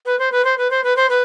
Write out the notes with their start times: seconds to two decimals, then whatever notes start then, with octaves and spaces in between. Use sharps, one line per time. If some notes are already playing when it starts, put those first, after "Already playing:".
0.05 B4
0.19 C5
0.31 B4
0.44 C5
0.57 B4
0.70 C5
0.83 B4
0.96 C5
1.09 B4